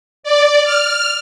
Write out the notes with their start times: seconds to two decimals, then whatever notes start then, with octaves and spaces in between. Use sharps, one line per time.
0.23 D5
0.64 F6